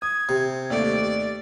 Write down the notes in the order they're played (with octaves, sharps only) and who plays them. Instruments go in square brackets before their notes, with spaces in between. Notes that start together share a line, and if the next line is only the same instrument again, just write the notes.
[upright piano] D#6 [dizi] G#6
[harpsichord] C3
[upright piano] D#2 A3 [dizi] D5